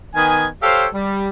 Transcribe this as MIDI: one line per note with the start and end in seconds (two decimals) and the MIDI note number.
0.15 0.47 51
0.15 0.47 59
0.15 0.47 80
0.62 0.86 67
0.62 0.86 69
0.62 0.86 72
0.62 0.86 73
0.62 0.86 77
0.93 1.28 55